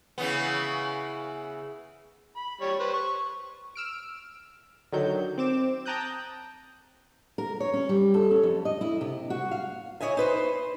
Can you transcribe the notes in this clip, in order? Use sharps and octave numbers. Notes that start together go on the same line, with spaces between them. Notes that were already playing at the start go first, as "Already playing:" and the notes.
C#3 E3 B3
B5
G3 C#5
B4 C5
C#6
E6 F6 D7
D3 D#3 F#3 G6
C4 D6 E7
G5 A5 A#5 D#6 F#6 G6
A#4
C#5
C#4
G3
A4
C#4
F2
D#5
E4
C3
F#4
F5
E4 C#5 D#5 E5 G#5
D#4 B4 C5